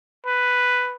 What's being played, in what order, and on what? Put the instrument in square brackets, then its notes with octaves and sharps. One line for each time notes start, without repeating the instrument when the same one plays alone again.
[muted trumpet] B4